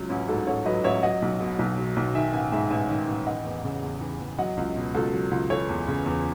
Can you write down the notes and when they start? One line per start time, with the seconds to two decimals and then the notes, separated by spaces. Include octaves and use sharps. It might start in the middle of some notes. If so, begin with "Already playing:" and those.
Already playing: C#2 F#3
0.09 A1 C#4 E4
0.28 G#2 F#4 A4
0.47 A1 A4 C#5
0.65 F#3 B4 D#5
0.84 A1 C#5 E5
1.03 F#3 D#5 F#5
1.22 B1
1.40 B2
1.59 B1
1.77 F#3
1.96 B1
2.15 D#3 E5 G#5
2.33 A1 E5 G#5
2.52 G#2 E5 G#5
2.70 A1 E5 G#5
2.89 D#3
3.08 A1
3.26 E3 D#5 F#5
3.45 E2
3.64 C#3
3.83 E2
4.01 E3
4.20 E2
4.39 F#3 D#5 F#5
4.57 C#2
4.76 B2
4.94 C#2 F#4 A4
5.13 F#3
5.31 C#2
5.50 E3 A4 C#5
5.69 E2
5.88 C#3
6.06 E2